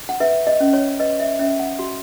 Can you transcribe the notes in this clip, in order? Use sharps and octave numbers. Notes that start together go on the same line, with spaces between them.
F#5
B4 E5
D#5
C#4
C#5
B4 D#5
E5
C#4 E5
F#5
F#4